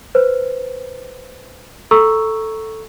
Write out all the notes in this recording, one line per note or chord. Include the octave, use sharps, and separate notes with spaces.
B4 C5
A4 A#5 C#6 E6